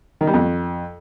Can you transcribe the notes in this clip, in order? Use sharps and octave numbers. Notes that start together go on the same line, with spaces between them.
D#3
G3
F2